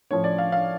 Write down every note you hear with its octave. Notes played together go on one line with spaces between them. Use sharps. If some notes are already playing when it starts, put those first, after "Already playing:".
A2 F3 C#4 C#5
D5
F5
F5